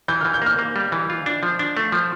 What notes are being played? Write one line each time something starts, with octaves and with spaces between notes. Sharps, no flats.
E3 G6
E3 F6
G6
A#3 F6
A#3
G3
E3
F4
D4
F3
D4
A3
F3